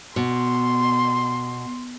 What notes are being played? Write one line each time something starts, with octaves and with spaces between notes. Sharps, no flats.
B2 C6